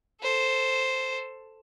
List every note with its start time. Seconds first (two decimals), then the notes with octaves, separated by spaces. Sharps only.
0.22 A4 C5